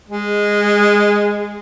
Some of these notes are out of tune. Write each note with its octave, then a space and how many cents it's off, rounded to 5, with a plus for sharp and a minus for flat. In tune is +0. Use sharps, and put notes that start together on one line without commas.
G#3 -10